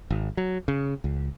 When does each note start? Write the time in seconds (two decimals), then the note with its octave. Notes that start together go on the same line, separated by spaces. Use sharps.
0.10 G#1
0.37 F#3
0.68 C#3
1.04 C#2